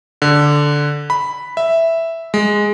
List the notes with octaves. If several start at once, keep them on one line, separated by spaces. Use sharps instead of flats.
D3
B5
E5
G#3